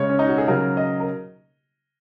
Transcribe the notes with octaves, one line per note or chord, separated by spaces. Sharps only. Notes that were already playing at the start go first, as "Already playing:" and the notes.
Already playing: C#3 G#3 C#5
C#4
D#4
F#4
G#4
C#3 F#3 A#4
D#5
A#4